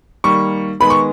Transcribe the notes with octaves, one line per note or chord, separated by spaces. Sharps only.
D#3 G3 A#3 C#6
D#3 G#3 B3 B5
C#6